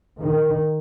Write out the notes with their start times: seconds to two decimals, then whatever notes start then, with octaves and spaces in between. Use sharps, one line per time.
0.20 D#3